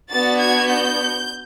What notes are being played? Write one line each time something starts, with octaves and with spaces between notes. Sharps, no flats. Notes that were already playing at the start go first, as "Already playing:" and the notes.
B3 D4 F#4 A6
G#6
G6